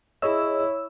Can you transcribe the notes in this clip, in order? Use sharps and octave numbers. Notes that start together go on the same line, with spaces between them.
E4 G#4 C#5 D#5 E6